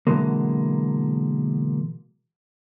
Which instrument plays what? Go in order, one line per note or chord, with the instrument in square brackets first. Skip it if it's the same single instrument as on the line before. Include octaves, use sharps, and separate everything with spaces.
[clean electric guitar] B2 D3 E3 F#3 G#3 A#3